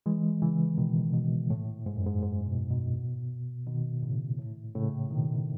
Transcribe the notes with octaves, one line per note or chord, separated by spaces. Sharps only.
E3 G#3
C#3 E3
B2 D#3
B2
A2
G#2
F#2
G#2
G#2
B2
B2
B2 D#3
A2 C#3
A2
A2 C#3
B2 D#3